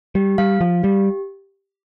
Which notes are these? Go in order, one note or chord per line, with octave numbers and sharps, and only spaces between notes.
G3 G4
G3 F5
F3 F5
G3 G4